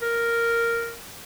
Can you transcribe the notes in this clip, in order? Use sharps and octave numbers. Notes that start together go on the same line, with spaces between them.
A#4